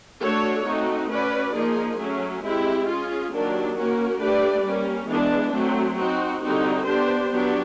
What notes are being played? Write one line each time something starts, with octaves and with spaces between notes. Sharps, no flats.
A3 D4 F#4 A4 C#5
A3 C4 D#4 F#4
C#4 F#4 B4 D5
F3 A#3 D#4 G#4
F#3 A3 C#4
G#3 C4 E4 G4
C#4 F4 G#4
D#3 F#3 A#3 D4 G4
A#3 C#4 F#4 A#4
A3 D4 G4 B4 D5
G3 A#3 C#4
E3 G#3 B3 D4
F#3 A3 C4
C4 D#4 F#4
D3 G3 C4 D#4 F#4
B3 D4 G4 C5
F#3 B3 D4 G4